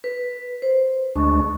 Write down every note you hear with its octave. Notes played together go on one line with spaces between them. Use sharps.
B4
C5
D2 G#3 D4 C#6